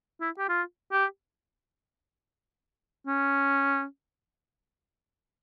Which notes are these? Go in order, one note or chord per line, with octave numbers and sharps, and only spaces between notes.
E4
G4
F4
G4
C#4